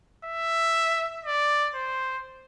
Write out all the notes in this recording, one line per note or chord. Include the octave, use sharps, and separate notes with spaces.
E5
D5
C5